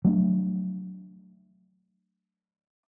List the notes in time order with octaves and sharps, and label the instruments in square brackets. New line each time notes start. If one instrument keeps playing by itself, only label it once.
[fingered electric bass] F#3 A3 C4 D4